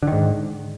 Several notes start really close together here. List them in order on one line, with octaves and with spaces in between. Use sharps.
D3 D#3 G#2